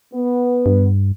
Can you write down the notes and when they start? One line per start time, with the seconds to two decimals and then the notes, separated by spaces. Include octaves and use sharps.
0.13 B3
0.66 G2